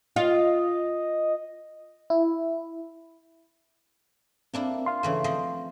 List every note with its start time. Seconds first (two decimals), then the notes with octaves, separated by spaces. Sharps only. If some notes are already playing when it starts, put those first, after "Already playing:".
0.16 F4 D#5
2.10 E4
4.54 A#3 C4 D4 E4
4.86 F5 C6
5.03 C#3 E3 A3
5.24 F3 C4 D#5